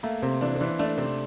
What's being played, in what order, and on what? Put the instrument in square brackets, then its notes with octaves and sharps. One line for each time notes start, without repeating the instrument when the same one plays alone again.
[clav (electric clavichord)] A3 [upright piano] A#3
[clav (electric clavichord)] C3 [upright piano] C4
[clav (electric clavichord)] E3 [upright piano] D4
[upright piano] C4
[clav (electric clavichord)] E3 [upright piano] D4
[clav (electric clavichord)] A3 [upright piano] D4
[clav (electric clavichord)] C3 [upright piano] C4